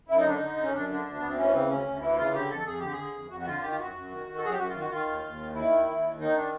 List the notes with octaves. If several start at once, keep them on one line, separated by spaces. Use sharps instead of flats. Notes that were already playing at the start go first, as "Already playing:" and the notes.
F#2 E4
D#4
D3 D4
D3 D#4
F#2 C#4
F#2 D4
D3 D4
D2
D2 B3
C4
E3 C#4
C#3 C4
D2 C#4
D2
E3 E4
C#3 F4
D3 G4
F2 A4
F2 G#4
D3 G4
G#4
D3
F2
F2 F#4
F#4
D3 F4
D#3 G4
F4
F#2 F#4
F#2
D#3
D#3
A4
F#2 G#4
G4
F#2 F#4
F4
D#3
F#4
D#3 F4
D#2
D#2
D#3
D#3 E4
D#2
D#2
D#3
D#3 D#4
D4